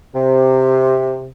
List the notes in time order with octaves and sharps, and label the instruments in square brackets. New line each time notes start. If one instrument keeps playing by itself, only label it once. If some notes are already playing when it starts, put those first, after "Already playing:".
[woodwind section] C3